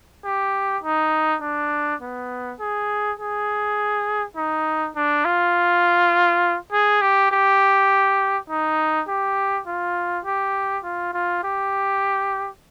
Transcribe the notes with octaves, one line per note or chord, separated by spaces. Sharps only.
G4
D#4
D4
B3
G#4
G#4
D#4
D4
F4
G#4
G4
G4
D#4
G4
F4
G4
F4
F4
G4